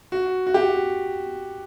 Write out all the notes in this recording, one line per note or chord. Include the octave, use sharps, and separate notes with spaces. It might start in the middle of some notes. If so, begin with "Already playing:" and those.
F#4
F#4
G4